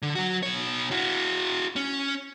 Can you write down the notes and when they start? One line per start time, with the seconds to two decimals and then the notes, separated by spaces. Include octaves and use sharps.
0.02 D3
0.15 F#3 F#4
0.43 B2 C#5
0.91 E4 F#4
1.76 C#4